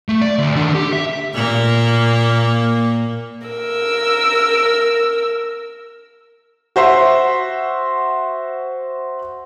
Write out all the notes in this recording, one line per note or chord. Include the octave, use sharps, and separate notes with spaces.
A3
D5
D2
D#3 D4
G4
E5
A#2 A#3
A#4 E6
F#4 C5 E5 C6